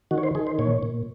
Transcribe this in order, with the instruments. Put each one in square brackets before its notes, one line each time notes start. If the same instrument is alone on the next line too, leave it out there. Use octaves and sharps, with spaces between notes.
[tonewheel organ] D#3 F#4
C#5
C5
D#3 G#4
C5
A#2 C#5
A#2